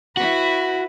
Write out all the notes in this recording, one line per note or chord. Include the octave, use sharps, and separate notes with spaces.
E4 F#4 B4